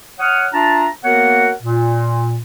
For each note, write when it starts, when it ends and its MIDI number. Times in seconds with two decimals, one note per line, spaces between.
0.19 0.47 73
0.19 0.47 78
0.19 0.47 87
0.19 0.47 89
0.53 0.87 62
0.53 0.87 65
0.53 0.87 76
0.53 0.87 81
0.53 0.87 82
1.04 1.51 58
1.04 1.51 59
1.04 1.51 66
1.04 1.51 70
1.04 1.51 73
1.04 1.51 78
1.62 2.41 46